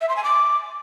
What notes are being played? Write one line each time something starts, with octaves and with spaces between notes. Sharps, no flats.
E5
C6
G#5
D6